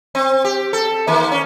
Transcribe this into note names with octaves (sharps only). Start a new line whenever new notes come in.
C4
G4
A4
D#3 A#3
C#4